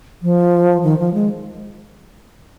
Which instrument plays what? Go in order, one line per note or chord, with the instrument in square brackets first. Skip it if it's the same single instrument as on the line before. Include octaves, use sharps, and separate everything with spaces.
[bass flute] F3
D#3
F3
G#3